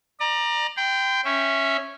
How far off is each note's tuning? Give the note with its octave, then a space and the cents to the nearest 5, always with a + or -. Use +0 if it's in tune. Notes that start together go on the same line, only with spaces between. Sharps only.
D5 +35 A#5 +15
G5 +0 C6 -40
C#4 -5 E5 +0